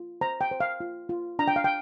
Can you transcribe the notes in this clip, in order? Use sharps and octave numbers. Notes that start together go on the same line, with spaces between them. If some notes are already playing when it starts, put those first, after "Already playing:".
Already playing: F4
C5 A#5
G5
C5
F5
F4
F4
D4 A#5
G5
F5
G5